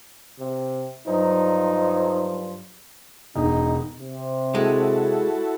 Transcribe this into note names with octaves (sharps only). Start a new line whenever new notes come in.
C3
G2 F3 F#3 D#4
E1 D#4
C3
G#3 E4 F#4 A4